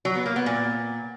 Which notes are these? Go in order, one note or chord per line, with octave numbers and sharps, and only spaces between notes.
F#3
B3
A#3
B3
A#2